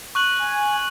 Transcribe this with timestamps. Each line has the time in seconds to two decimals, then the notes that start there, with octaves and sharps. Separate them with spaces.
0.15 C#6 F#6 F#7
0.39 G#5